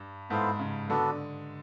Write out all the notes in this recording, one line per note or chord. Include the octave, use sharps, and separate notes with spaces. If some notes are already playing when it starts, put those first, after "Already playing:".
Already playing: G2
G#2 B3 E4 A4 C5 F5
C#3
D3 B3 D4 F#4 A4